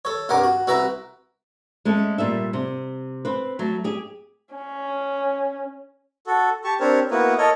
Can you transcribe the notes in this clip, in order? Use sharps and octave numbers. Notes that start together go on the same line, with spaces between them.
A4 C#5
C2 G2 A#4 F#5 G#5 D6
F#4
C2 E4 F#4 B4 E5 A#5
G#3 A3 C#4
A#2 G3 E5
C3
C4 B4
F#3 A3
G4 G#4
C#4
F#4 A4
G4 A5 C#6
C4 D4 G4 A#4 C5 C#5
A#3 B3 E4 F#4 A#4 B4
A4 A#4 C#5 D#5